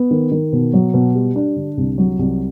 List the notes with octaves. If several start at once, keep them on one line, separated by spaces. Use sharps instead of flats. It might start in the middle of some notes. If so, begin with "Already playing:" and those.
Already playing: B3
D#3
D#3
B2
F#3
B2
G3
D4
D3
C2
F#3
C2